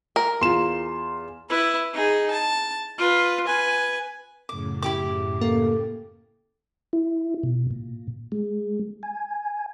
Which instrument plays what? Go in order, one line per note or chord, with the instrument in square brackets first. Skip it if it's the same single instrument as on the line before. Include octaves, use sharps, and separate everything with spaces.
[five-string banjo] A#4
[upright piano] E2 F4 [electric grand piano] C6 E7
[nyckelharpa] E4 B4
D#4 G#4
A5
F4 B4
B4 G#5
[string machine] F#2 A2 C#3 [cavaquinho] D6
[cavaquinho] E4 G4 D6
[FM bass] A#3 [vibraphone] A4
[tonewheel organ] E4
B2
A#2
G#3
G#5